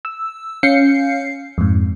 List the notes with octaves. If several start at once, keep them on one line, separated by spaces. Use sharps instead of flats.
E6
C#4 F5 G6 C7 C#7
F2 G#2